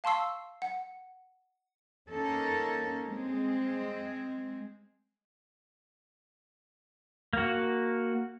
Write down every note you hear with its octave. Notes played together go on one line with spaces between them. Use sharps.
F5 A5 C6 C#6 E6 C7
F#5
A#3 C#4 D#4 A4
G#3 C4
A#3 F#4